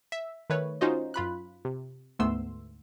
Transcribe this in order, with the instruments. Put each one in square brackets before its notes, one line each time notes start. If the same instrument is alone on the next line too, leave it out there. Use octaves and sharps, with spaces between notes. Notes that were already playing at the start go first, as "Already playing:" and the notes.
[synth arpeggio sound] E5
D#3 A3 B4 C#5
C#4 D#4 F4 F#4 C5 D#5
F#2 F4 B5 F#6
C3
D2 G#2 A3 B3 C6 E6